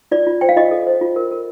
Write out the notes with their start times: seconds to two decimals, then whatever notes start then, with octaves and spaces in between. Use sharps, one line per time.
0.11 F4 D5
0.27 F4
0.41 C5 G5
0.49 F5
0.56 F4 D#5
0.71 A4
0.87 C5
1.01 F4
1.16 A#4
1.31 A#4